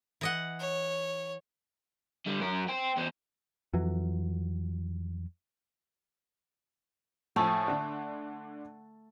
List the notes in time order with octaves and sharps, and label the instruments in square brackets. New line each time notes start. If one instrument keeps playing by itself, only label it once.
[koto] E3 D#5 F#5
[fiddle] C#5
[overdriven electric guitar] D3 G3
F#2 A#4
C5 G5
E2 C5
[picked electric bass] F2 E3 F#3
[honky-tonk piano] A2 F3 G#5 [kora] A3
[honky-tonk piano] D3 D4